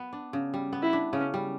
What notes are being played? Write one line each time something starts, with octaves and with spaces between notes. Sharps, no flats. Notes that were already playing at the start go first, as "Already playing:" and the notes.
Already playing: B3
D4
C#3
G3
B3
E4
D4
C#3 C#4
G3